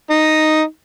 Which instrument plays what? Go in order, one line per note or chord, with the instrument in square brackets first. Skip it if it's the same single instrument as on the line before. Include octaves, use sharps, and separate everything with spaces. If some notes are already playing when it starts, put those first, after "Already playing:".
[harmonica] D#4